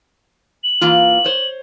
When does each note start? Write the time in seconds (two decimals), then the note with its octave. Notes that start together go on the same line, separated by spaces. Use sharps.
0.64 F#7
0.81 E3 A#3 F4
1.24 C5 C#5